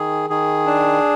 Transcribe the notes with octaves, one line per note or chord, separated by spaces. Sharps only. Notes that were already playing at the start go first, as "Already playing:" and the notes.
Already playing: D#3 G#4
D#3 G#4
D4